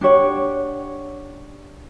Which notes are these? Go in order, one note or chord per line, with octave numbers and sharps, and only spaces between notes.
D4 G4 C#5 F#5